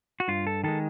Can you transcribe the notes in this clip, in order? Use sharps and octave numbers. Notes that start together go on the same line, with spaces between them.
F#4
G2 F4
A4
D#3 G#3 A4